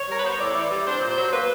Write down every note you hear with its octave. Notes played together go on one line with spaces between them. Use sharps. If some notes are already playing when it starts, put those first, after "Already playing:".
Already playing: C#5
G3 A#4
B4
B3 C5
C#5
A2 D5
E3
G3
D4 C5
A#2
C5
F#3
A#3 B4